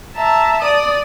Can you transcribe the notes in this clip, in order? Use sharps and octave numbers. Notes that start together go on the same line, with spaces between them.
E5 A5 A#5
D5 D#6